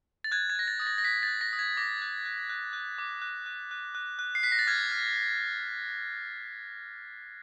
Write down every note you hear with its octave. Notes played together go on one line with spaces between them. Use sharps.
A6
F#6 G#6
G#6
F#6 A#6
A6
D#6 A6
A#6
A#6
F#6 B6
F#6 A6
A#6
D#6
G#6
D6 A#6
F#6
F#6
F#6
F#6
D6
F#6
F#6
F#6
F#6
F#6
C7
F#6 B6
A#6
A6
F6 G#6
F6